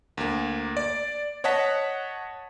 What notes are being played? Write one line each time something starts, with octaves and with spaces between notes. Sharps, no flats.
D2 A#3
D5
C#5 D#5 F#5 A5 B6